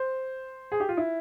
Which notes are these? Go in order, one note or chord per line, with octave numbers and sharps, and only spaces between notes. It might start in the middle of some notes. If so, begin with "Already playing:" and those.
Already playing: C5
G#4
G4
F4
E4